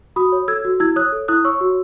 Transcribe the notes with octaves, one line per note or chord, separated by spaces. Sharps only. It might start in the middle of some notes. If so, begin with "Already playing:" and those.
F#4 B5 D#6
C#5
A4 E6 G#6
F#4
E4 E6 G#6
C#5 D#6 F#6
A4
E4 D#6 F#6
C#5 C#6 E6
F#4